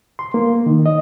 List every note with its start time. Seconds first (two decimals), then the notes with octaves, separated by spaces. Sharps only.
0.19 C6
0.34 A#3
0.66 D#3
0.86 D#5